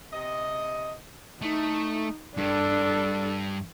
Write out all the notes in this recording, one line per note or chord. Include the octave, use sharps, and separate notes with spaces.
C3 D#5
A3 D#4
G2 G3 D4 A4